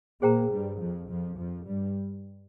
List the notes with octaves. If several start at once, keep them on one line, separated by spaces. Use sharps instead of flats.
A#2 A#3 G#4 C5 G5 A#5
G2 G3
F2 F3
F2 F3
F2 F3
G2 G3